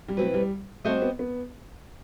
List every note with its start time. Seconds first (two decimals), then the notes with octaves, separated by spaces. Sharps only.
0.08 G3
0.17 B2 F#3 A3 C4 E4 B4
0.34 G3
0.85 G3 A3 C4 F#4 C5 D#5
1.02 B3
1.19 B3